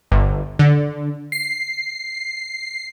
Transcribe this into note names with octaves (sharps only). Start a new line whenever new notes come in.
G1
D3
C7